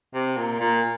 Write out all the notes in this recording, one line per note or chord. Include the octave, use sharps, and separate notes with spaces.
C3
A#2
A#2